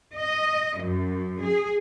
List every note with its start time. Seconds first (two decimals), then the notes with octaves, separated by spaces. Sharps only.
0.16 D#5
0.79 F#2
1.42 G#4